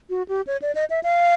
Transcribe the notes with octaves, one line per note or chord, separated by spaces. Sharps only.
F#4
G4
C#5
D5
D#5
E5
F5